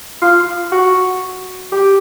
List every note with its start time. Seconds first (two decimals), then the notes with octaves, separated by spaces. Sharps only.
0.22 F4
0.72 F#4
1.72 G4